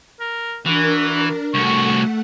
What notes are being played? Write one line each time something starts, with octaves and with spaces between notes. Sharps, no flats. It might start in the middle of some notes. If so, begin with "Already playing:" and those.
A#4
E3 D4 F#4 A#4
C2 A3 F#4 F#5 C#6